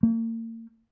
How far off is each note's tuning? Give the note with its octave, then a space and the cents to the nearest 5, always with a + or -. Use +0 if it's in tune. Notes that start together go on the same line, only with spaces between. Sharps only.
A#3 -40